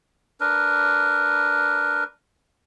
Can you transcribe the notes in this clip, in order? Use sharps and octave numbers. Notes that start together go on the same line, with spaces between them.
D4 A#4 B4